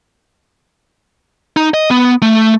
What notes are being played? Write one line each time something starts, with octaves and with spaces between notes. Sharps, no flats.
D#4
D#5
B3
A3